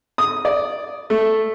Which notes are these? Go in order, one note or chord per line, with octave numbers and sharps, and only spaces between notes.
D#6
D5
A3